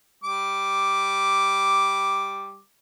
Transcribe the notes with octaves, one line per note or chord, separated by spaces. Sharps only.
G3 D6